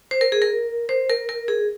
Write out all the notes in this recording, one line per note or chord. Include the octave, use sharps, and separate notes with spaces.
C5
A#4
G#4
A#4
C5
A#4
A#4
G#4